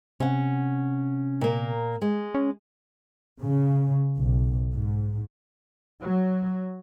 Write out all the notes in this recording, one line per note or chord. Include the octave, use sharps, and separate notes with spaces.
C3 C#4 F#5
A#2 A#3
G#3
C#4
C#3
B1
G#2
F#3